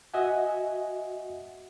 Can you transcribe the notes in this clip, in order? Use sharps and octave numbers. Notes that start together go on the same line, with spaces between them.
F#4 D#5 E5 F#5 G#5